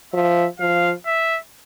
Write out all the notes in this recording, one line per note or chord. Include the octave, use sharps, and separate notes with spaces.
F3 E5
F3 F5
E5